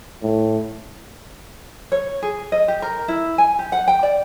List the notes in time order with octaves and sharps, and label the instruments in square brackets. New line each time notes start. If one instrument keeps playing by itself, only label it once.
[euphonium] A2
[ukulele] C#5
G#4
D#5
G4
A#4
E4
G#5
G4
F#5
G5
D5